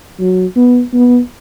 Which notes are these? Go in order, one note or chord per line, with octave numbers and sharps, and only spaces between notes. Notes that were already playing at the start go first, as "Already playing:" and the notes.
F#3
B3
B3